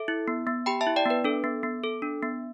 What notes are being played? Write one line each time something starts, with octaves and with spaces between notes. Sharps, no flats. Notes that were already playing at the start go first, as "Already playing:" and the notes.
Already playing: A4 E5
E4
B3
B3
G4 G5 B5
E5 A5
E4
D5 G5
B3 B4
D4 A4
B3
B3
A4
D4
B3